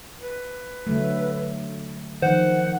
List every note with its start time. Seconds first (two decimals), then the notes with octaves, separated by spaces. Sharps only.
0.20 B4
0.87 D3 F#3 A3
2.22 D#3 F3 C5 F#5